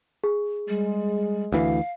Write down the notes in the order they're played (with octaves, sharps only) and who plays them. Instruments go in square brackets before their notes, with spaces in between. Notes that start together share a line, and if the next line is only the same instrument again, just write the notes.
[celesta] G#4
[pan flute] G3 [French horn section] G#3
[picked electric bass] D2 E3 [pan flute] F5